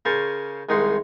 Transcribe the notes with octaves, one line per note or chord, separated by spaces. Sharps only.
C#3 A#4 C5 G#5 A5 C#6
C2 D#3 G#3 D#4 F#5 C6